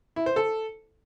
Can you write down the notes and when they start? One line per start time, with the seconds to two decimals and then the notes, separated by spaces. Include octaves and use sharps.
0.16 E4
0.26 C5
0.36 A4